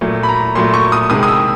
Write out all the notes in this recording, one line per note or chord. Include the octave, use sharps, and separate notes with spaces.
A#2 F#3 A3
B5
A#5
A#2 F#3 A3 C6
C#6
D#6
C3 D#3 G#3 D#6
D#6
E6